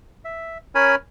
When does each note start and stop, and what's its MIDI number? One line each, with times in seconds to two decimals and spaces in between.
0.25 0.58 76
0.75 0.95 61
0.75 0.95 70
0.75 0.95 73
0.75 0.95 80
0.75 0.95 83